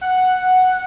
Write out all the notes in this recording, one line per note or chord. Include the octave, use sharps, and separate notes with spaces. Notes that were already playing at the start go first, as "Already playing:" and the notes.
F#5